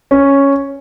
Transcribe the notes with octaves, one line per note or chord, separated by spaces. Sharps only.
C#4